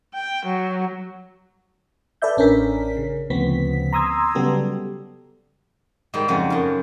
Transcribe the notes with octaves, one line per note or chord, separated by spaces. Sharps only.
G5
F#3
A4 B4 D5 E5 G6
A1 C#4 D4 A#4 B6
C#3
D2 C#3 F3 B3 C4 B6
A#5 C6 D#6 E6 G#6
C#3 F#3 G3 B3 G4 A4
G#2 D#3 G3 G5
F2 C#3 F#3
F#2 F5